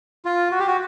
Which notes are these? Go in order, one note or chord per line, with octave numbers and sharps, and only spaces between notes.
F4
F#4
G4
F#4